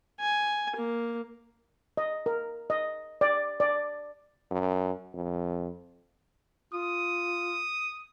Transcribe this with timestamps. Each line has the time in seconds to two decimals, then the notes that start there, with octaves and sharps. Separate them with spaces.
0.20 G#5
0.77 A#3
1.97 D#5
2.26 A#4
2.70 D#5
3.21 D5
3.60 D5
4.51 F#2
5.14 F2
6.73 F4 D#6